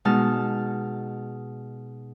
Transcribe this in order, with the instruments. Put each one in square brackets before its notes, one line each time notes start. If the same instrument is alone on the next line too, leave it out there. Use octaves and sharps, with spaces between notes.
[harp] B2 G#3 D#4 A5 F6